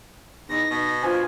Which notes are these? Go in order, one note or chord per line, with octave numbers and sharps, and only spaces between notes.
E2 D#4 A#6
B2
D4 F4 C5 G#5